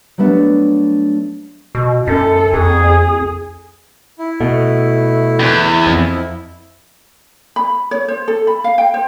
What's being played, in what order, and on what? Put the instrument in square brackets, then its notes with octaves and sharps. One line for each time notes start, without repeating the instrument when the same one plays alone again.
[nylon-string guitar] F#3 G3 A3 B3 D4
[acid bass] B2
[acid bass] F#2 [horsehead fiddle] A4
[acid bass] F2 [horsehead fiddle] G#4
[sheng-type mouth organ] E4
[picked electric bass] B2 [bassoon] A3
[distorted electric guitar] E2
[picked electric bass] F2
[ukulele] B5
C#5
C5
A4
B5
F5
G5
C5